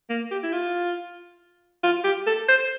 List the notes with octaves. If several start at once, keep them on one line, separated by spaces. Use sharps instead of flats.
A#3
G4
E4
F4
F4
G4
A4
C5